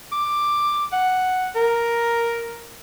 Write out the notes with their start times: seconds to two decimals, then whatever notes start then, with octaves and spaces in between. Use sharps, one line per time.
0.12 D6
0.92 F#5
1.55 A#4